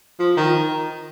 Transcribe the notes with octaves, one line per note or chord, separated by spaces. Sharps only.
F3
D#3